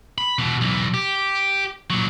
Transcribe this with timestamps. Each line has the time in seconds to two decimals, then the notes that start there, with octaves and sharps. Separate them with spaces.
0.18 B5
0.39 B2 E3
0.61 B1 E3
0.94 G4
1.90 A#2 F#3